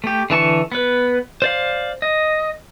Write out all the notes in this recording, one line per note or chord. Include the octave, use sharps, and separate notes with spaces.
A3 G4
D3 E3 A5 C#6
B3 B4
C5 D5 F5
D#5